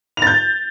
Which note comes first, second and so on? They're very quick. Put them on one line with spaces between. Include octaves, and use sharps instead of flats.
F7 A6 G6